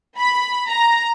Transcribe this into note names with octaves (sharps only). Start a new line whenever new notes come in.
B5
A#5